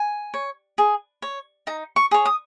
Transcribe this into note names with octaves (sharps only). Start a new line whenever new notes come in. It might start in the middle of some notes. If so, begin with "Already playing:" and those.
Already playing: G#5
C#5
G#4
C#5
D#4 A#5
C#6
G#4 C#5
D#6